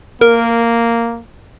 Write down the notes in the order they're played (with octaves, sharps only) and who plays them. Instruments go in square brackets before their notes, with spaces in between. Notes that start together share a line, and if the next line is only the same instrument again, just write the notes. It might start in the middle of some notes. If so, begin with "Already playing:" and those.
[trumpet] A#3 [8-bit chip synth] A#4